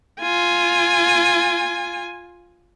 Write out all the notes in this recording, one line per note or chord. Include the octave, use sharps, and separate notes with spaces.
F4 G#5